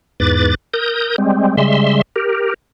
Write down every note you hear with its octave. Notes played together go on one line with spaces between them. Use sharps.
E2 G#2 B4 D6 A6
A#4 D#6 G6
G3 G#3 C4
C#3 G3 G#3 E5 C6
G4 A#4